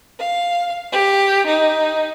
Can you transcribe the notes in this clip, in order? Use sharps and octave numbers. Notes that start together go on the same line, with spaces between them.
F5
G4
D#4